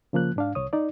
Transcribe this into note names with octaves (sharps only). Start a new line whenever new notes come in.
C#3 F3 A#3 F#6
G#2 D4 F5
C2 C#5 D#6
D#4 D5